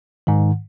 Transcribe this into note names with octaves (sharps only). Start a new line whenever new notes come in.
G#2 D#3